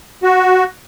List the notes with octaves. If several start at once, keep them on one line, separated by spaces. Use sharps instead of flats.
F#4